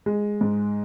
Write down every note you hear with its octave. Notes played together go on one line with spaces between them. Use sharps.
G#3
G#2